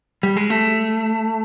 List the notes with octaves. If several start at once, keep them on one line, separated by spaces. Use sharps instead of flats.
G3
G#3
A3